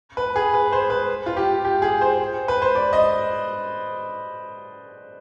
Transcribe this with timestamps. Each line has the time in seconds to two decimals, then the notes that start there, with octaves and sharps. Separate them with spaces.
0.17 B4
0.36 G#4
0.54 B4
0.72 C5
0.90 B4
1.26 F4
1.37 G4
1.65 G4
1.82 G#4
2.01 C5
2.48 B4
2.62 C5
2.75 D5
2.93 D#5